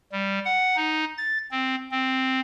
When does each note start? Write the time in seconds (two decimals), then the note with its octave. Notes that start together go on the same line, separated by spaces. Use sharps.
0.12 G3
0.45 F#5
0.76 D#4
1.18 A6
1.51 C4
1.91 C4